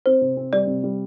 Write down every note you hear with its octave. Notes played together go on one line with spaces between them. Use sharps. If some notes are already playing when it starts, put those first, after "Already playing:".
C4 C5
C3
C4
G3 D5
C3
G3